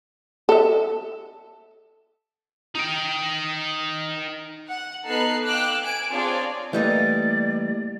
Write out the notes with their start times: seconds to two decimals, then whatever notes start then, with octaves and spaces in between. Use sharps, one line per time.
0.49 A4 E5
2.75 D#4 G5
4.69 F#5
5.07 B3 D#4 A4 B4 F#6 C7
5.46 F5 G5 D6 E6 F#6
5.82 G#5 D7
6.11 C4 D4 F4 G#4 C#5 D5
6.73 E3 G3 A3 A#3 D#4 D5